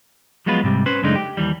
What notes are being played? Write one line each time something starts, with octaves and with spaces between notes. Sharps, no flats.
F3 F#3 G#3 B3 F4 B4
G#2 C3 G3
C#4 B4 C5
F#2 C#3 G#3 A3 D4 D#4
G4
D#2 E3 G3